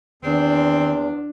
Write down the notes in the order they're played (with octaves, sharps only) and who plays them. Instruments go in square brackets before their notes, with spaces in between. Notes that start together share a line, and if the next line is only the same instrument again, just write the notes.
[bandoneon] E2 [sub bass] D#3 [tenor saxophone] C4 [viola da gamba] D4